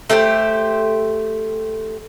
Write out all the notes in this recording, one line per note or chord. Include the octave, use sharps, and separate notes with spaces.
A3 G4 G#4 C5